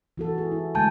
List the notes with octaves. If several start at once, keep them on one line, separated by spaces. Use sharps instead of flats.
E3 F#4 A4
G#4
E4
D3 G#3 A3 G#5 A5 G6